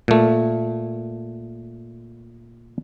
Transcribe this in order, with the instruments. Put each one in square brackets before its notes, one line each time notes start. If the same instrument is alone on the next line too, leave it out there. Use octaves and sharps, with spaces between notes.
[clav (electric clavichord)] A#2 A3